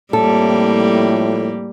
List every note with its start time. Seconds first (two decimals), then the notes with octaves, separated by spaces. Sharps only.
0.13 F2 A2 G3 A#3 A4